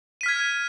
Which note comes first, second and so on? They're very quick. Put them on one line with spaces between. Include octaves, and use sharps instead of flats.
D#7 B6 F6 G#6